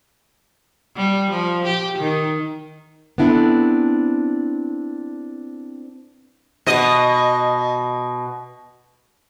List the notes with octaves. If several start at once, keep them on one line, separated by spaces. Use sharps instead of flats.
G3
F3
G4
D#3
B3 C4 D4 E4 G#4 A4
B2 D#5